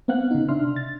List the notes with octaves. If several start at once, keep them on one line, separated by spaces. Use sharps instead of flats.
B3 C4 F5 F#5 F#6
C#3 D#4
C3 D4 E5 C6 F6
A6